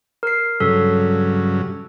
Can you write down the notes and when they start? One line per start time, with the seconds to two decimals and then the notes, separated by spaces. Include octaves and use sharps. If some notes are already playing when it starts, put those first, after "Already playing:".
0.23 A#4 C7
0.60 G2 C#3 F#3 A4